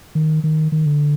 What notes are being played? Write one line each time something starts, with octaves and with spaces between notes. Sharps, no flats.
D#3
D#3
D#3
D3